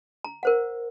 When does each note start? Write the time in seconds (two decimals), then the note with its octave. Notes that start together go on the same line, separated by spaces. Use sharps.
0.24 A#5
0.43 A#4 C5 F#5